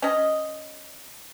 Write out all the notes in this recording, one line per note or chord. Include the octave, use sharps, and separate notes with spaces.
C#4 D#5